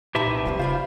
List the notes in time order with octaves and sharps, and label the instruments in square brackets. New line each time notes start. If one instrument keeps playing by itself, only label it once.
[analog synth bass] A#2 [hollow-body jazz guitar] D#4 A5 C6 [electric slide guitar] G4 B4 E5
[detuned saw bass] C2
[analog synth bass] F1 [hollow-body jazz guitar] F#2 C3 F3
[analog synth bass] C#3 [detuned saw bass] F4 [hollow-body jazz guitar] C5 D5 B5